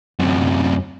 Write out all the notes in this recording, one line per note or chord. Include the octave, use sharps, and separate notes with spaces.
F#2 C3